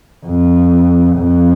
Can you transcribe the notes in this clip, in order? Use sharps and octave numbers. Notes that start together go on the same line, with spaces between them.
F2
F2